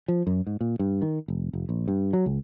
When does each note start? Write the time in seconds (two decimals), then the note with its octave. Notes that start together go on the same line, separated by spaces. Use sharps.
0.08 F3
0.27 F#2
0.47 G#2
0.61 A#2
0.79 G2
1.02 D#3
1.28 F1
1.53 F1
1.69 A#1
1.88 G2
2.13 F#3
2.26 C#2